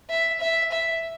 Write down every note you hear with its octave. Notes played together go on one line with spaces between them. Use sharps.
E5
E5
E5